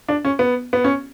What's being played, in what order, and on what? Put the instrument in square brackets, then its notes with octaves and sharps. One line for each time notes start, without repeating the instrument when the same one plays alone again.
[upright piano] D4
C#4
B3
B3
C#4